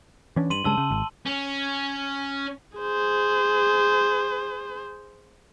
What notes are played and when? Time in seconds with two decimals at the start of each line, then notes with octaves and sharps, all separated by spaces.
0.36 E3 C#4 D4
0.50 G2 C6 D#7 F#7
0.64 G2 C#3 G#3 A5 E6 G7
0.78 C#3
0.91 G#1
1.26 C#4
2.78 G#4 C5